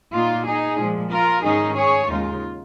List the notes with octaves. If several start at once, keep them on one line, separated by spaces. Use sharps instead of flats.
A#2 A#3 D#4 F4
D#4 G#4
A#2 F3 G#3
F4 A#4
G#2 D#3 C#4 D#4 G#4
G#4 C#5
D#2 C#3 G#3 D#4 F4